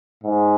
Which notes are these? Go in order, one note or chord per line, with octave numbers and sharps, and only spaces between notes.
G#2